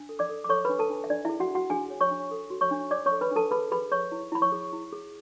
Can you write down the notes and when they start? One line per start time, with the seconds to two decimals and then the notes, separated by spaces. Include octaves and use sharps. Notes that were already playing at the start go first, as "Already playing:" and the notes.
Already playing: D4
0.09 A4
0.19 D5 D6
0.29 A4
0.44 D6
0.49 A4 C#5 C#6
0.65 D4 B4 B5
0.79 A4 A5
0.90 D4
1.04 E5
1.10 D4 D5
1.25 E4 G#4 E5
1.40 F#4 F#5
1.50 D4
1.55 F#4 F#5
1.70 D4 G#4 G#5
1.90 C#5
2.01 C#5 C#6
2.11 D4
2.31 A4
2.50 F#4
2.61 C#5 C#6
2.71 D4
2.91 C#5 D5 D6
3.06 C#5 C#6
3.11 A4
3.21 B4 B5
3.31 D4 A4 A5
3.51 G#4 B4 B5
3.71 G#4 B4 B5
3.92 C#5 C#6
4.12 E4
4.32 E4 B5
4.42 C#5 C#6
4.52 G#4
4.73 E4
4.93 G#4